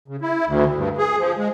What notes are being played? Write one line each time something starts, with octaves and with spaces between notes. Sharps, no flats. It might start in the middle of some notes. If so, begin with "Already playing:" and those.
C#3
E4
D2
G2
G#4
F3
G#3